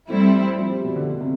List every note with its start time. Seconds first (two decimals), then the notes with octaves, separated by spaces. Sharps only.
0.10 G3 A3 C4 E4
0.59 F3
0.72 G3
0.84 B2
0.96 D3
1.08 B2
1.20 C3